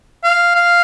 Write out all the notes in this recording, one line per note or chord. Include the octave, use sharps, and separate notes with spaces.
F5
F5